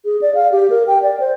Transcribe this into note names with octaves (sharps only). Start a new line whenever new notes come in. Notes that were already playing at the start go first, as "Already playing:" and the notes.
G#4
D5
F5
G4
A#4
G5
D5
C5